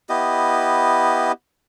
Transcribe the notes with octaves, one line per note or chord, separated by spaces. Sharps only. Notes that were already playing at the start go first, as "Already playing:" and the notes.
B3 E4 G4 D#5